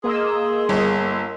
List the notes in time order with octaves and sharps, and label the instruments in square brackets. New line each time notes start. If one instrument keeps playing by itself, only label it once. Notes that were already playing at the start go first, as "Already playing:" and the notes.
[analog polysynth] A#3 D#5 E6 [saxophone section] G#4 [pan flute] C6
[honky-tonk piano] G1